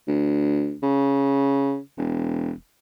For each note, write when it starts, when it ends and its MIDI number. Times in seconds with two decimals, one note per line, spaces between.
0.08 0.75 38
0.83 1.79 49
1.98 2.52 28